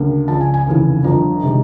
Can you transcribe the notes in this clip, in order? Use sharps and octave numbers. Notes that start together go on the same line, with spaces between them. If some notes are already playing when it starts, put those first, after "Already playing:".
Already playing: D2 C#3 A#3
C#2 C#3 F3 A5
G#5
G#5
F1 D#2 C#3 E3
G1 F2 D3 F3 A#5
C3 D#3 G#3